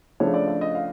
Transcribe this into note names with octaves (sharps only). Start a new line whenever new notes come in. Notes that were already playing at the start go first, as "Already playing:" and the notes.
C#3 F3 A3 D4 C#5
D5
D5
D#5
F5